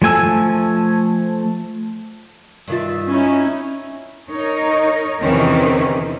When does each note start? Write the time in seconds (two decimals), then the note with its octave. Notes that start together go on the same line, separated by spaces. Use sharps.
0.02 F3 A3 G#5 E6
2.68 G2 D#3 F4 E5
3.09 C#4 D#4 E4
4.31 D#4 A#4 C#5 D#5
5.22 E2 C3 D#3 E3 C4 C#4